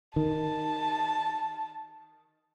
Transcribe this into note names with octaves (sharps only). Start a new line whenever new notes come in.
D#3 A5